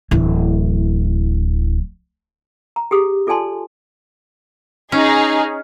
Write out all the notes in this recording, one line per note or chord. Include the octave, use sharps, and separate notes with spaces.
D1 E3
A#5
G4 G#4 D#6
F4 A4 D5 G#5 A5 C6
C#4 D#4 G#4